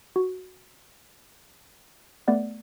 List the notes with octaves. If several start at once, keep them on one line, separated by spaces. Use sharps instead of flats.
F#4
A3 B3 D5 F#5